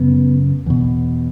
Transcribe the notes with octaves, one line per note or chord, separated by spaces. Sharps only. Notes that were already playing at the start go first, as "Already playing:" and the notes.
Already playing: F#2 C#3 B3
E2 B2